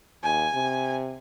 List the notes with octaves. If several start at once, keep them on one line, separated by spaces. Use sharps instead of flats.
D#2 G#5
C3